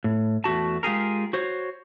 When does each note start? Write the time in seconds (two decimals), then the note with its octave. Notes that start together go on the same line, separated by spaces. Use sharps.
0.04 A2
0.44 E2 A3 F#4 A5
0.83 G#3 F4 G4 G#4 A#4
1.33 F#4 C5 C#5